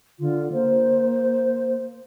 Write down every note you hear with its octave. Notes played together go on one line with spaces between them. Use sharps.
D3 F4
A#3 C5